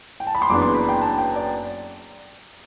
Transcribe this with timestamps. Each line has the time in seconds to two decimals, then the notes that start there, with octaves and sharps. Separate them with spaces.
0.20 G5
0.27 A5
0.35 B5
0.42 C6
0.49 F#1 F#2 E3 B3 D4 D6
0.62 C6
0.75 B5
0.89 G5
1.01 A5
1.18 G5
1.36 D5